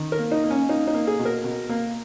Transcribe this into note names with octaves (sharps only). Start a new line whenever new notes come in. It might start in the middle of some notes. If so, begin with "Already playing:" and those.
Already playing: D#3
A#4
A#3
D#4
A#3
C#4
A#3 D#4
D#4
A#3
G#4
B2
A#4
B2
A#3